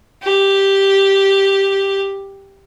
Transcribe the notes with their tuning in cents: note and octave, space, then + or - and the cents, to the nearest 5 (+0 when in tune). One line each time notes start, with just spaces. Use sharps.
G4 +0